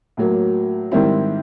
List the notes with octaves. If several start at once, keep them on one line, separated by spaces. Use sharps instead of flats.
A2 F#3 A#3
G#2 D#3 G3 C4 E4